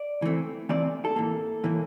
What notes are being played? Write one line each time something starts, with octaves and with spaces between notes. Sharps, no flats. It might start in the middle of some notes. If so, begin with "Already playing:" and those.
Already playing: D5
E3 A3 C4
E3 A3 C4 D5
A4
A2 E3 A#3
A2 E3 A#3